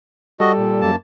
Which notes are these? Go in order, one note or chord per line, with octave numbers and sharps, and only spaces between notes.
G3 F#4 A4 D#5
A#2
F#2 A#3 A5